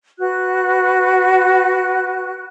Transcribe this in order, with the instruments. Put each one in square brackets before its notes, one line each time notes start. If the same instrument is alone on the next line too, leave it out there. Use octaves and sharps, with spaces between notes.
[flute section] F#4 B4 F#6